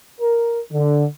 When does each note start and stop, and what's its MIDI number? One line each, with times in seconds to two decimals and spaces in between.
0.19 0.60 70
0.73 1.06 50